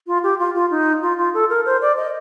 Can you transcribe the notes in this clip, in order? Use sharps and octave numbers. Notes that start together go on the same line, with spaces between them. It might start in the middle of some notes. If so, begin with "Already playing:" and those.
F4
G4
F4
F4
D#4
F4
F4
A4
A#4
C5
D5
D#5